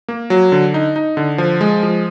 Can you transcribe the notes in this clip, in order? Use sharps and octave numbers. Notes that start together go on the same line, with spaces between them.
A#3
F#3
D3
D#4
D#4
D3
F3
G#3
F3